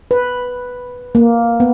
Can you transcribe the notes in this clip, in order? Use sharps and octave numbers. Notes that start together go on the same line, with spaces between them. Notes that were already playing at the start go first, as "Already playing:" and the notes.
B4
A#3
B3